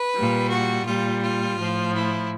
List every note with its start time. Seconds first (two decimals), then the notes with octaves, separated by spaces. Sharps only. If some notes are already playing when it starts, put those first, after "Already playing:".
Already playing: B4
0.15 A#2 G3
0.51 F#4
0.86 A#2 G3 F4
1.23 F4
1.59 A2 F3
1.94 E4